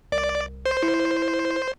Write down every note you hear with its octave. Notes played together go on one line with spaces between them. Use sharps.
C2 D5
C5
E4